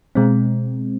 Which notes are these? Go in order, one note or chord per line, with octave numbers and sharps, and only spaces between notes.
B2 G#3 C4